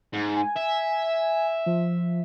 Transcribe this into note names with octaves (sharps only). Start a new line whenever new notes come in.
G#2
G#5
E5
F3